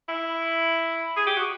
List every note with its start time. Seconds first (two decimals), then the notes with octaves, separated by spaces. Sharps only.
0.09 E4
1.17 G#4
1.27 G4
1.37 F#4